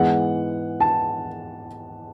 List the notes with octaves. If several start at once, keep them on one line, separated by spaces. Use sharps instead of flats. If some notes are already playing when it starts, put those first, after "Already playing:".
Already playing: G#2 E3 G#3 B3 F#5
A5